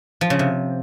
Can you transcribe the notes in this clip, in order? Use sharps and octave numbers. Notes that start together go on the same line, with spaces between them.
F3
C#3
C3